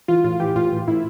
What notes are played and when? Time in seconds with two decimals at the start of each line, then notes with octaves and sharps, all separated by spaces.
0.08 E3 F4
0.24 A2 F4
0.40 E3 G4
0.56 A2 F4
0.72 E3
0.87 A2 E4